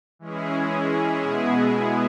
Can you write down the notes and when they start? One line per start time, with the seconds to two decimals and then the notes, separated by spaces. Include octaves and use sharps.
0.19 E3 G#3 C#4 E4 G#4
1.21 B2 G#3 B3 E4 G#4